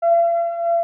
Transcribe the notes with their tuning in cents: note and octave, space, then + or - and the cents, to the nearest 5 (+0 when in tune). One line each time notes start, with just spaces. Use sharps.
F5 -45